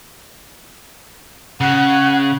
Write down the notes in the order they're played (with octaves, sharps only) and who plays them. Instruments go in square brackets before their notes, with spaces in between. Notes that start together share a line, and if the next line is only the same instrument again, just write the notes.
[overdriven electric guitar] C#3 [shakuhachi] F#5